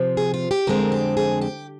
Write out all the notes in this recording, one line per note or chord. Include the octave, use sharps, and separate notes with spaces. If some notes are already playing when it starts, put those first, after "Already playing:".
Already playing: C3 F3 C4
G#4
F4
G4
F2 D3 G#3 C4 A#4
G4
G#4
G4